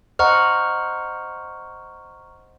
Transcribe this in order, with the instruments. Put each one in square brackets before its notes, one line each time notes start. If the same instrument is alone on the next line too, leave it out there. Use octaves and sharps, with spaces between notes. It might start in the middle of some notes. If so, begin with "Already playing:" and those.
[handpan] C5 D#5 F#5 [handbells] A#5 C#6 F6